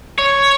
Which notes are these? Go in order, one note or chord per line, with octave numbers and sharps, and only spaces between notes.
C#5